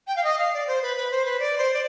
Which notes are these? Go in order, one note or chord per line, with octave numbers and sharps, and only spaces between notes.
G5
F5
D#5
F5
D5
C5
B4
B4
C5
B4
D5
C5
D5